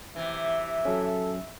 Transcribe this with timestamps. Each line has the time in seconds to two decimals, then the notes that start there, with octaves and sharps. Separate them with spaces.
0.16 C3 E3 E5
0.85 F#3 C#4 A4